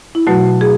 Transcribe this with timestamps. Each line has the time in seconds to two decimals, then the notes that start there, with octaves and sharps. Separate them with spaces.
0.15 E4
0.27 B2 F#3 A3 F#4
0.61 G#4